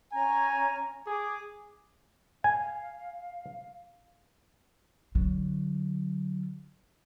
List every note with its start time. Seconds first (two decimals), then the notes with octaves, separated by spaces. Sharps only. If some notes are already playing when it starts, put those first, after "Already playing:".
0.12 C#4 G#5 A#5
1.07 G#4 D6
2.44 F5 G#5
5.15 D3 F#3